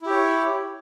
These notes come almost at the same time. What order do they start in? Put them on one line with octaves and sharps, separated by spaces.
E4 G4 C#5